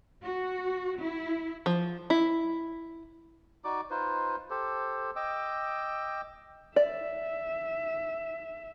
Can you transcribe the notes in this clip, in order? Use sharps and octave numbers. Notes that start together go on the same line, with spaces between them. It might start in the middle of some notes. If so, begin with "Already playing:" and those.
F#4
E4
F3
E4
D#4 F#4 D5 D6
D#4 F4 B4 C5
G4 A4 C5
D#5 G5 D6 E6
D5 E5